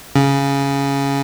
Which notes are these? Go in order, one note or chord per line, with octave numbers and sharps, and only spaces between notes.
C#3